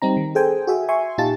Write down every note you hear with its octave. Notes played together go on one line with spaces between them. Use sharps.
G3 C4 D#4 A#5
D#3
G#4 A4 C5 G5 G#5
F#4 G#4 E5 G#5
E5 G#5 C6 C#6
A#2 D#4 F4 G4 A5 A6